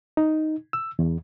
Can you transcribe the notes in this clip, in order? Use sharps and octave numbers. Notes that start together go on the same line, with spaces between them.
D#4
E6
E2